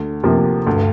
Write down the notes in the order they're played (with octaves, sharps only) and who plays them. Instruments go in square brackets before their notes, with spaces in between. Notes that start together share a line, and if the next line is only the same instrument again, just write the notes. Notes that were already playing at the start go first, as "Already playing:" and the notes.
Already playing: [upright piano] D2
[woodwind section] F#2 [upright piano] C3 F3 A#3
[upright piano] D2 [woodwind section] G2